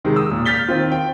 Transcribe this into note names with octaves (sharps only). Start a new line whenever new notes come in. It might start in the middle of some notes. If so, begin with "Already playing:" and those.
C3 D#3 G#3
D#6 E6
A#2
F6 G6 A6 B6 G7
D#3 C4 F4
G5